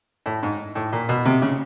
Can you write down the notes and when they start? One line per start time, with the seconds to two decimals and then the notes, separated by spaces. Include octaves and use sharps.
0.26 A2
0.43 G#2
0.75 A2
0.93 A#2
1.09 B2
1.25 C3
1.42 C#3